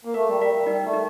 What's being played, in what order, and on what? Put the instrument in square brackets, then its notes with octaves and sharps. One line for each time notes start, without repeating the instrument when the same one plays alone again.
[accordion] A#3
[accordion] A3 [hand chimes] A#4
[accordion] G3
[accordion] G3 [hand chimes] A#4
[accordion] G3
[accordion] G3 [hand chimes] D#4
[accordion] A3
[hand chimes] D#4